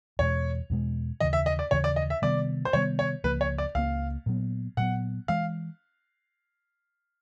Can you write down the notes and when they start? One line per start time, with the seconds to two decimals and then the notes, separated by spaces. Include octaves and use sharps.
0.19 E2 B2 G#3 C#5
0.70 E2 B2 G#3
1.20 D#2 C#3 E3 D#5
1.33 E5
1.46 D#5
1.59 D5
1.71 D#2 C#3 E3 C#5
1.84 D5
1.96 D#5
2.10 E5
2.22 C3 D#3 G3 B3 D5
2.65 C5
2.73 C3 D#3 G3 B3 C#5
2.99 C#5
3.24 C#2 C#3 F3 A#3 B4
3.41 C#5
3.58 D5
3.75 C#2 C#3 F3 A#3 F5
4.26 A#2 F#3 B3
4.77 A#2 F#3 B3 F#5
5.28 E3 G#3 F5